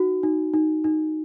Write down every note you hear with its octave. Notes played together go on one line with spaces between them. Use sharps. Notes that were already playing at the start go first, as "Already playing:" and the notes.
Already playing: D#4 F#4
D#4
D#4
D#4